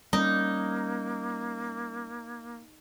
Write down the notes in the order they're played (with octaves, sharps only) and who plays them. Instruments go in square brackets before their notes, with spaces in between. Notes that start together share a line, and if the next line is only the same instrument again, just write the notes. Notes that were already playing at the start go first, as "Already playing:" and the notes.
[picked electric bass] G3 A3 C#4 [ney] A#3 [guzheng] D#4